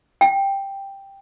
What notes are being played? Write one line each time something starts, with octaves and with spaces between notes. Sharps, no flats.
G5